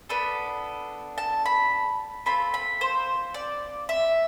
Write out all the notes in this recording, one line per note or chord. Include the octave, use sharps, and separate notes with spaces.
B3 D4 A4 B5
A5
B5
C4 F4 A4 B5
B5
C5
D5
E5